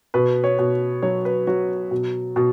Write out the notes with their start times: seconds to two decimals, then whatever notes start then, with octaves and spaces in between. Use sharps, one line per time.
0.14 B2 B4
0.44 C#5
0.59 B2
1.02 F#3 C#5
1.25 B4
1.47 F#3 F#4
1.91 B2
2.36 B2